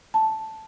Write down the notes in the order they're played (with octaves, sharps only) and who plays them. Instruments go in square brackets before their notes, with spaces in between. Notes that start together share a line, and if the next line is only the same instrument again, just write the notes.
[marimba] A5